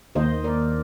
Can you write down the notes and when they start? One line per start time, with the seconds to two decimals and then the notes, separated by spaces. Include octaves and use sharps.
0.15 D#2 D#3 A#3 C5 D#5
0.44 A#4 D5